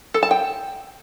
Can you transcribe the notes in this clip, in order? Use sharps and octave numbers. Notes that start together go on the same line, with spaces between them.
A4
A5
G5